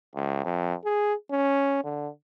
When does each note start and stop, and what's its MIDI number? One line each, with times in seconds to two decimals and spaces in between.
0.15 0.42 37
0.45 0.74 41
0.85 1.14 68
1.31 1.83 61
1.85 2.08 50